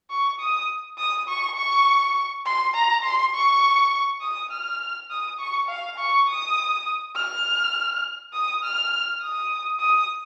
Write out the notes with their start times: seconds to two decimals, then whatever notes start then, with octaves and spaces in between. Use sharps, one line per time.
0.10 C#6
0.39 D#6
0.98 D#6
1.28 C#6
1.57 C#6
2.45 C6
2.75 A#5
3.04 C6
3.34 C#6
4.22 D#6
4.51 F6
5.10 D#6
5.39 C#6
5.68 F5
5.98 C#6
6.27 D#6
7.16 F6
8.33 D#6
8.63 F6
9.22 D#6
9.80 D#6